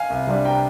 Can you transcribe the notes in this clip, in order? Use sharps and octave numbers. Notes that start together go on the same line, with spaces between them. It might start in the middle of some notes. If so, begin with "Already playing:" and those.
Already playing: F5 G#5
C2
C3 G3 D4
G5 A#5